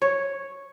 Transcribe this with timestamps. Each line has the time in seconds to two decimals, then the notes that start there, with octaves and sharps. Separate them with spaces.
0.02 C#5